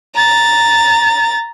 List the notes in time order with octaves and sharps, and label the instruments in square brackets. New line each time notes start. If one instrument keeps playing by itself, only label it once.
[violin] A#5 A6